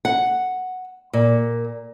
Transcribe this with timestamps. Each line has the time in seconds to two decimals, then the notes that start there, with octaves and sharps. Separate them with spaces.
0.05 F#5
1.13 A#2